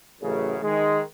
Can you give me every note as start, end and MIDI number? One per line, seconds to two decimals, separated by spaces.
0.21 0.56 33
0.21 0.56 42
0.21 0.56 49
0.62 1.00 51
0.62 1.00 56